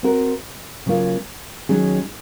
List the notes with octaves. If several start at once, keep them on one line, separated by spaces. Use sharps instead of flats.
C4 F#4 A#4
C#3 F#3 A#3 F4
D#3 F#3 C#4 G#4